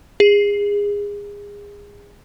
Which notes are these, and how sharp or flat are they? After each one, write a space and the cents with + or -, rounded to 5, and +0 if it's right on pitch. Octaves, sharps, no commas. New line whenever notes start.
G#4 -25